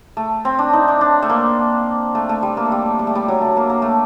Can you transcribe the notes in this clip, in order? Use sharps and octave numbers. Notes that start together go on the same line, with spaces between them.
A3
C4
D4
D#4
D4
D4
A3
A#3
A3
A3
G3
A#3
A3
G3
G3
A3
G3
F#3
A3
A#3
A#3
A3